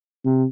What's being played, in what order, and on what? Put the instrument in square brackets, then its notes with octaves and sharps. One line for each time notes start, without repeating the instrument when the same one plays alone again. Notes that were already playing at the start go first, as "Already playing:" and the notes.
[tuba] C3